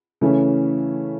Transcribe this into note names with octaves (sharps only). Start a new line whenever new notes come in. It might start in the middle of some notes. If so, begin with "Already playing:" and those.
C#3 E3 A3 C#4